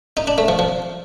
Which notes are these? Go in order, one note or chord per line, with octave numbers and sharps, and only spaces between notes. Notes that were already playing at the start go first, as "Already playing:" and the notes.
D#4
D4
A3
F3
F3